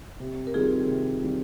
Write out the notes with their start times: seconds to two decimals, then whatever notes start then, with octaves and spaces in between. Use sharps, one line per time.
0.20 C3
0.47 A#4
0.54 D#3 G3 C4 F4 G#4
0.89 C3
1.23 D#3 G3 C4